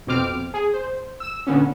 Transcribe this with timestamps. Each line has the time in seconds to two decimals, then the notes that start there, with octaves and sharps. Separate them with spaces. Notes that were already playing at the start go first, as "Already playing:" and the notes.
0.07 F2 B2 C4 D6 F6 D7
0.54 G#4
0.74 C5
1.20 E6 E7
1.47 A#2 D3 B3 C#4